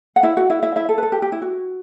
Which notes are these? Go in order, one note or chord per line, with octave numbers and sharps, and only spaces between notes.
F#5
E4 E5
F#4 F#5
E4 E5
E4 E5
E4 E5
A4
B4
A4
G4
G4
E4
F#4